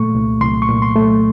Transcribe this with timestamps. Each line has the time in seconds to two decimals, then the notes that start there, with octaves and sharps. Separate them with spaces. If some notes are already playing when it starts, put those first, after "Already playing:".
Already playing: A#2 A3 C#6
0.15 C2
0.41 C2 C6
0.62 C#6
0.69 A#2
0.82 C6
0.96 A3